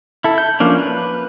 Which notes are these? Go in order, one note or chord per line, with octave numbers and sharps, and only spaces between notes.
E4 A4
G6
F3 A#3 C#4 D4
B4